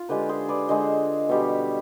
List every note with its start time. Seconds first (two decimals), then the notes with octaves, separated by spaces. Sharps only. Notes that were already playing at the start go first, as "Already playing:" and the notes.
Already playing: F4
0.09 D3 G#3 G4 B4
0.29 G#4 C5
0.48 B4 D5
0.68 D3 G#3 C5 D#5
1.29 B2 G3